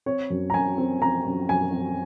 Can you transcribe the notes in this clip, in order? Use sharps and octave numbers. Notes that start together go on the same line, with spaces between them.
C4 C#5
F#2
A#5
F#2 G#5
C4
C4 A#5
F#2
F#2 G#5
C4